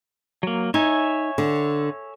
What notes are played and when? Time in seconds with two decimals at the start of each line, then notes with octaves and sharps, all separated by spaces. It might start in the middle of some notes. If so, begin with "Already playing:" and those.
0.43 F#3 A#3
0.74 D#4 C#5 E5 G#5
1.38 D3